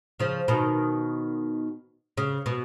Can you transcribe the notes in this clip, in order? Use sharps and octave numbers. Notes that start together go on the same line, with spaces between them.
C#3 F3
B2 D#3
C#3
B2